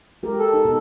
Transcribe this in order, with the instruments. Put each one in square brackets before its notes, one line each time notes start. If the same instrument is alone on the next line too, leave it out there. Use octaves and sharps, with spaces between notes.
[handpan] G#3 G4 A#4
[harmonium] A4
[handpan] D#4
B2